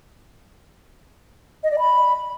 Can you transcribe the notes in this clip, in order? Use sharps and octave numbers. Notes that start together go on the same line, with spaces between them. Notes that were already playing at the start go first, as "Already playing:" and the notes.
D#5
D5
B5